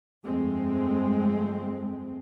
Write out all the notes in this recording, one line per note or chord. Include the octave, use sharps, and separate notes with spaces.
G1 F2 G#3 A3 C4